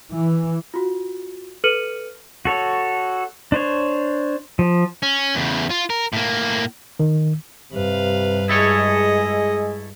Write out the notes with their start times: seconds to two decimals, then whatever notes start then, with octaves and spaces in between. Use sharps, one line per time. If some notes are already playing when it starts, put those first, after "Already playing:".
0.12 E3
0.74 F4 F#4
1.64 A4 B4 F6 C#7 D#7 F#7
2.45 F#4 A4 C#5
3.52 D4 C5 C#5
4.59 F3
5.03 C#4
5.35 E2 C#3
5.70 F4
5.90 A#4
6.13 A2 A#3
7.00 D#3
7.73 G2 C3 B4 F5
8.49 G#3 E4 G#4 A4 C#5 D#5